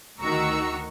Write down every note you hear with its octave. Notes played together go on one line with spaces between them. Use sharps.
D2 D#3 F#4 A#5 C#6 E6